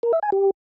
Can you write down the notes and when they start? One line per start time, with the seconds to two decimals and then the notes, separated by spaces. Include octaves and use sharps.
0.03 A#4
0.13 E5
0.23 G#5
0.32 G4